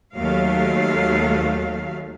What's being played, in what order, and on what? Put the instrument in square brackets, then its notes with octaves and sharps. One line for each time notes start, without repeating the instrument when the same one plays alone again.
[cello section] D#2 F#3 A3 F5